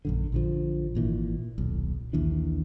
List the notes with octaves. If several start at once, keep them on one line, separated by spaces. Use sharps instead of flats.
A#1 F#2 D3
A#1 D3 F3
G#1 A#2 E3
D#1 B1
A#1 D#2 E3 D4